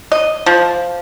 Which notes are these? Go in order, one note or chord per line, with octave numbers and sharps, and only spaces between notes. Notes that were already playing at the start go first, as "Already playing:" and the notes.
D#5
F3